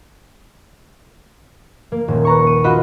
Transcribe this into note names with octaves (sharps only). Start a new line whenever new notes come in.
A#3
D#1
B4 A#5 C#6
D#7
F4 F#4 D#5 B5